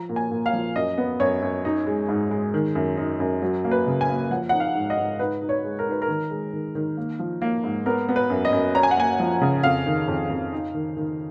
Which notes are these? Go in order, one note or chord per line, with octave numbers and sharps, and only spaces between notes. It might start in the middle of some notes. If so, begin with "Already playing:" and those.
Already playing: F3 A#5
A#2
G#5
A#2
F5
F3
F#2 D#5
B3
F#2 C#5
F#2
D#4
G#3
G#2
G#3
D#3
F#2
D#4
F#2
F#3
A#3
B4
C#3
G#5
A#3
F3 F#5
D#4 F#5
F5
G#2
D#5
G#2
D#4 B4
D#4
C#5
G#3
A#4
D#4 B4
A#4
D#3
G#3
D#3
D#3
A#3
F3
A#3
G#2
B3 A#4
B3
B4
F#2
D#5
F#2
C#4 A#5
G#5
F#5
A#3 G#5
F3
C#3
F2 F5
D#3
F2
F2
D#4
D#3
D#3